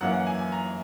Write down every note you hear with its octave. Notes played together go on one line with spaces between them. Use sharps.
F#2 E3 A#3 C#4 F#5
F#5
G#5
G#5
A#5